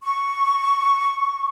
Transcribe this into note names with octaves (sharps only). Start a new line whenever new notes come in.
C#6